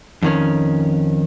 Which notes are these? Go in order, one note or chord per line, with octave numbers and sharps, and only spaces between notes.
F2 D#3 C#4